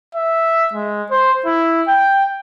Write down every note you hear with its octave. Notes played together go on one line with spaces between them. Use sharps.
E5
G#3
C5
E4
G5